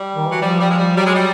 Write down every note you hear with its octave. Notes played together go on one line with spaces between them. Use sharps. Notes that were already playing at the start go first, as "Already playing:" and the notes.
Already playing: G3
D#3
E3 F#3
F3 G3
G3
G#3
G3
F#3 G3
G#3
G3